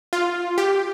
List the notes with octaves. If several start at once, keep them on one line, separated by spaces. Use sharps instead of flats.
F4
G4